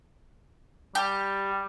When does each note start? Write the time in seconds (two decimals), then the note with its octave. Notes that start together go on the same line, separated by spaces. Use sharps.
0.95 G3 G4